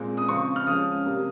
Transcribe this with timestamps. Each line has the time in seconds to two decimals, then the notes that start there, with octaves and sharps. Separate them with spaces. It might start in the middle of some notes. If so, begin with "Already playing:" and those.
Already playing: A#2 G#3 C4
0.17 D#6
0.29 C#3 F3 C4 C#6
0.56 F6
0.67 F3 G#3 C#4 D#6
1.05 C3 G3 A#3